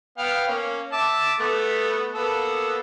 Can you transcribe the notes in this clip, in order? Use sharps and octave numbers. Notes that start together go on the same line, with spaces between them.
B3 F5 G5
A#3 C#4
E5 A5 D6
A3 B3
A#3 B3 A4